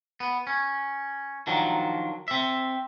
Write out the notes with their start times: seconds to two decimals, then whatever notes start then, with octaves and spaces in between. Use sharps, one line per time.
0.20 B3
0.47 C#4
1.47 D#3 F3 F#3 D4
2.28 C4 E5